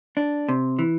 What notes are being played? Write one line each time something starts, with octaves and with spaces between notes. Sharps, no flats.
D4
C3
E3